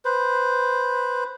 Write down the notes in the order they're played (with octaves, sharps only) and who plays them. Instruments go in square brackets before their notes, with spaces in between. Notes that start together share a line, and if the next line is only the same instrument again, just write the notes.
[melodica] B4 C5